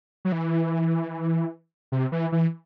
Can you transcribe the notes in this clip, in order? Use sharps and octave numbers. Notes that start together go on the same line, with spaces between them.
F#3
E3
C3
E3
E3